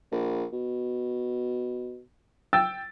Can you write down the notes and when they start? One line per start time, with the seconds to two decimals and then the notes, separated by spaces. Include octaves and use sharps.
0.12 A#1
0.53 B2
2.53 G5 E6 A6